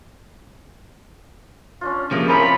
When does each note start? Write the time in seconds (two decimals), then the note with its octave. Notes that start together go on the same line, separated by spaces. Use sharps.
1.81 C#4 D4 F4
2.11 C#3 F3 A#3 G4 D#5 E5
2.28 C4 C#4 E4 F4 G#4 A#4 D5 B5